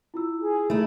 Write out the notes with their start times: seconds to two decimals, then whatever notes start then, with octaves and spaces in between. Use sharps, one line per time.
0.14 E4 F4 E6
0.40 G#4
0.70 A3 D#4 E4